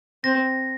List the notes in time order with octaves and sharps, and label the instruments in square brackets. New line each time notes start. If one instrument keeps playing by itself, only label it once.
[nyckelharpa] C4 [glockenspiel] A#6